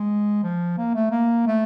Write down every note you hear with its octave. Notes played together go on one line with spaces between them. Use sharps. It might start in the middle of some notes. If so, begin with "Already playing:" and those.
Already playing: G#3
F3
A#3
A3
A#3
A3